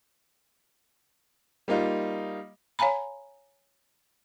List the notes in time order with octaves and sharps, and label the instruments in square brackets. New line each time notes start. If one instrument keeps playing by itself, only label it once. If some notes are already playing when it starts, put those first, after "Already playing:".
[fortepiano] G3 A#3 D#4 F4
[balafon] C#5 F5 G#5 A#5 B5